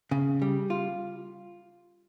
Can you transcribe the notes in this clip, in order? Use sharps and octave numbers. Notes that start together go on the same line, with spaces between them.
C#3
G3
F4